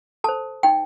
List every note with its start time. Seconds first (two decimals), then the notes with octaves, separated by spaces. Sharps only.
0.24 A4 C5 A5
0.63 D#4 G5